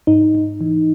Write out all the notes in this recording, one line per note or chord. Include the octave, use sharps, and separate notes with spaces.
G#2 D#4
G#2
E3